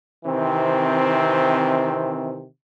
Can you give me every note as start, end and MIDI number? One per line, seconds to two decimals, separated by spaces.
0.25 2.44 48
0.25 2.44 51
0.25 2.44 52
0.25 2.44 60